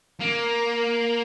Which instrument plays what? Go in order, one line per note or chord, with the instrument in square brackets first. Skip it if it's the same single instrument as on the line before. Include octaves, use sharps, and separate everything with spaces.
[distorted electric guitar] A#3